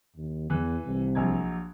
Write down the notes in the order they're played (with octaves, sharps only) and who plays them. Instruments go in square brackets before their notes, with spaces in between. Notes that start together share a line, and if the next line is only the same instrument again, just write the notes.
[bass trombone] D#2
[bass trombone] E2 [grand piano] E3 F#6
[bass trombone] C2
[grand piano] A#1 F#3 G#6